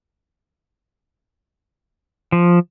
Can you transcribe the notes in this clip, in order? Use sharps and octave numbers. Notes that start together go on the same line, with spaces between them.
F3